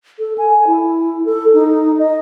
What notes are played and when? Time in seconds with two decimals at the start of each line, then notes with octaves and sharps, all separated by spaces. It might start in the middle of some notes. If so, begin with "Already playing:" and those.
0.19 A4
0.38 G#5
0.67 E4
1.26 A4
1.54 D#4
1.99 D#5